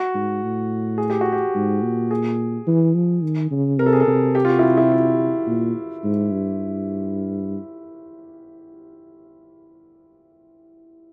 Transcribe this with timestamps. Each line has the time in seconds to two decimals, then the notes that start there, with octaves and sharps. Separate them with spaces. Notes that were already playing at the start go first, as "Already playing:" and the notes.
Already playing: F#4
0.14 G#2
0.43 A2
0.98 G#4
1.10 G4
1.21 F#4
1.32 G4
1.55 G#2
1.83 A#2
2.11 G#4
2.67 E3
2.95 F3
3.23 D#3
3.51 C#3
3.79 C3 A#4
3.86 A4
3.93 G#4
4.00 A4
4.07 C3
4.35 G4
4.45 F4
4.50 F#4
4.59 E4
4.63 F4
4.77 E4
4.92 F4
5.47 A#2
6.04 G#2
6.31 G2